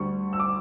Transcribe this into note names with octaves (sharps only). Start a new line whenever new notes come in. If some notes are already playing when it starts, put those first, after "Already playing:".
Already playing: D2 D3 G3 C#6
E6
D6